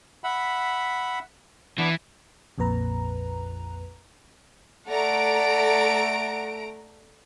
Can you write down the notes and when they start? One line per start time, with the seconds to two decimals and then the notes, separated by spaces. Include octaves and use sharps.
0.24 E5 F#5 B5
1.78 E3 B3 D4
2.58 A#1 F2 A#2 B4 A#5
4.88 A3 D5 F#5 A#5 D7